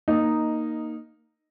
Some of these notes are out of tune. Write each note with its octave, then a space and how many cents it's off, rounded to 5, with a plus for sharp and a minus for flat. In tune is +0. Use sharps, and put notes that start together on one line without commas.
A#3 +0 D#4 -5 D#5 +0